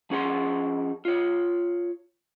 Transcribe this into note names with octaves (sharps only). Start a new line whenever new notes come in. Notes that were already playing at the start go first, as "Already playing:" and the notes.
F3 C#4 G#4 F#5 C6
F4 C#5